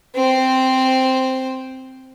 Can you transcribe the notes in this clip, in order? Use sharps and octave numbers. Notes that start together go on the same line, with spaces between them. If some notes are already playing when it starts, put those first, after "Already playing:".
C4 C5